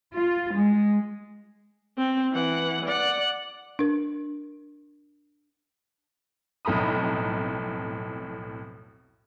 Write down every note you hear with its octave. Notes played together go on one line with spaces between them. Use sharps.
F4
G#3
C4
E3 F#5
D5 F#5
D4 A#4
B1 F2 A2 A#5 B5 D#6